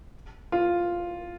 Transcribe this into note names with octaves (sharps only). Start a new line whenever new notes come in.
F4